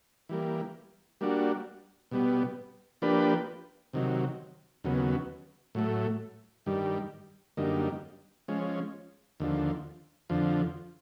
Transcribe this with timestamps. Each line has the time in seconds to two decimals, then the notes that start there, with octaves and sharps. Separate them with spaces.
0.29 E3 G3 A#3
1.21 G3 A#3 D4 F#4
2.11 B2 G3 B3
3.02 F3 A#3 D4 G4 B4
3.93 C3 D#3 F#3
4.84 D#2 C#3 F#3 B3
5.75 A2 F#3 A3
6.66 G2 D#3 G3
7.57 F#2 D3 G3 A#3 D#4
8.48 F3 G#3 C#4
9.40 D#2 D3 F3
10.30 F2 D3 F3